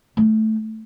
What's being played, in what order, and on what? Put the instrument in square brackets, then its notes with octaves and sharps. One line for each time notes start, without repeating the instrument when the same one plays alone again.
[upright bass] A3